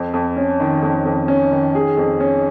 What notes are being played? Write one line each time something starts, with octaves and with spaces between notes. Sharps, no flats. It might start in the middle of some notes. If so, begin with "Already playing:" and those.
Already playing: F2
F2
C#4
D#3
F2
F2
C#4
D#3
G#4
F2
C#4